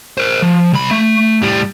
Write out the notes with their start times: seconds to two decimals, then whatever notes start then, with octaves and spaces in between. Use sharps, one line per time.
0.18 A#4 C5
0.42 F3
0.73 C2 B5
0.91 A3
1.42 A2 G3